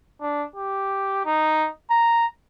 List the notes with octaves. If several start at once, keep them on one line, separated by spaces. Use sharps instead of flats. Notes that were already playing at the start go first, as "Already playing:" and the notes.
D4
G4
D#4
A#5